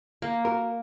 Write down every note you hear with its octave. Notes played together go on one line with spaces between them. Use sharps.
A#3
F#4 A#4